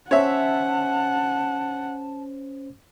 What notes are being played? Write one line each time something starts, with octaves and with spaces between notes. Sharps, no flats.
C#4 C5 C#5 E5 F#5 A5